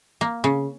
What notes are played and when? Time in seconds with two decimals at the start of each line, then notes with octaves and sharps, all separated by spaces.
0.21 A#3
0.44 C#3